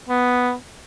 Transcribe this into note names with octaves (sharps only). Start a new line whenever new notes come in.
B3